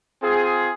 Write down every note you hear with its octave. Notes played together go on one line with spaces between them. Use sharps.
C4 F4 G#4